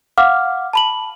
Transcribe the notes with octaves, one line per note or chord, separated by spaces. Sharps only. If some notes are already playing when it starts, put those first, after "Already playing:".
F5 F#5 D6 F6
A5 B5 F#7